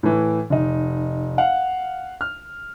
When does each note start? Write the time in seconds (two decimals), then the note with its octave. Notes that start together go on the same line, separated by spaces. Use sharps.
0.03 A2 E3
0.50 F1 D#4
1.38 F5 F#5
2.21 F6